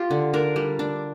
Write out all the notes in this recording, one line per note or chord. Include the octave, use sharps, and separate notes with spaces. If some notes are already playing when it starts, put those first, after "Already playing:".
Already playing: F4 G4
D3
D4 A#4
G3
D4